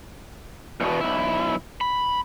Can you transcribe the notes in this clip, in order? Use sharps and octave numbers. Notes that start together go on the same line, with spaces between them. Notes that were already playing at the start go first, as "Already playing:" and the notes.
E2 B2
B1 E4
B5